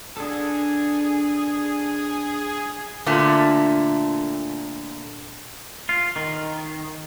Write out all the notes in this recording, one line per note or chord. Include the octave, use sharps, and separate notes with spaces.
D4 G#4 A4
A#2 D3 A3
F4
D#3